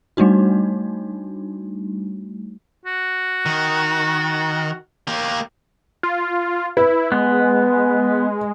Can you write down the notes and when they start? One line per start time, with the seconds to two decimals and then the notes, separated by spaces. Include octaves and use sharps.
0.17 G3 A3 D4 D#4 F#4
2.85 F#4
3.46 D#3
5.07 A#3 G4
6.03 F4
6.77 E4 B4
7.12 G#3 B3